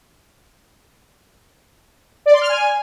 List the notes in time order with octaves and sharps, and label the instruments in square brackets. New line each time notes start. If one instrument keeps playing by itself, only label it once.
[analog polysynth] D5
C6
F6
G#5